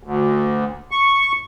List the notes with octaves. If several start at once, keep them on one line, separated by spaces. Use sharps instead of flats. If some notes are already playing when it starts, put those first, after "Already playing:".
D2
C#6